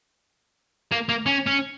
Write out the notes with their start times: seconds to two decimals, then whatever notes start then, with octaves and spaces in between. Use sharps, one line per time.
0.92 A#3
1.09 A#3
1.26 C#4
1.47 C#4